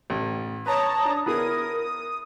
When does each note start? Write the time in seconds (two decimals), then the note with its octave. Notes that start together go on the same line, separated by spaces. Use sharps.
0.10 A1
0.66 B4 C#5 A5 A#5 D#6
1.05 D4
1.26 B3 E4 G#4 A#4 D#6